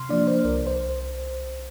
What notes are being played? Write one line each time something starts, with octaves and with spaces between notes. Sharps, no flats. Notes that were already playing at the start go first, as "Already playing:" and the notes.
Already playing: C3 C6 F6
F3 A#3 D4 D5
C5
C2 A#4
C5